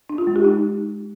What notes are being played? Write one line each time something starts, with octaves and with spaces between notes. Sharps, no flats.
D4
F4
G#3
G4
D#4